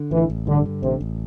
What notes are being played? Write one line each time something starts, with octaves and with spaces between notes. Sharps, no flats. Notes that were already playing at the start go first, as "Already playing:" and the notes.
Already playing: D3
A1 E3
A1
G2 D3
D3
A1 C3
A1